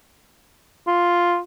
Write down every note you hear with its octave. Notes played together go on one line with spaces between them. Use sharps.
F4